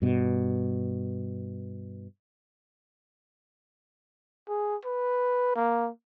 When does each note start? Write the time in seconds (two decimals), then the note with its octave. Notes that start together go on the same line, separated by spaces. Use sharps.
0.02 G2 B2
4.48 G#4
4.85 B4
5.55 A#3